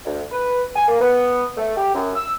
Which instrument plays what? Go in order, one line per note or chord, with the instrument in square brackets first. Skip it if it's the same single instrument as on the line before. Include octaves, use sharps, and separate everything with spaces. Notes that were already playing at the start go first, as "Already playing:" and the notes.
[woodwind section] D2
B4
G#5
A#3
B3
A3
G4
F#2
E6